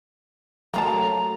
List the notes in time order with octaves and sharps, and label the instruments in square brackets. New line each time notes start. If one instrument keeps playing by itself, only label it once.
[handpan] F#3 A3 [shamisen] A#3 F4 A5 [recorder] A#5